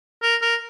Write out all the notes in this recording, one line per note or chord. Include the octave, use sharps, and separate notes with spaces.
A#4
A#4